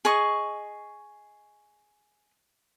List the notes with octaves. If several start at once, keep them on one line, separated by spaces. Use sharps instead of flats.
G#4 D#5 C#6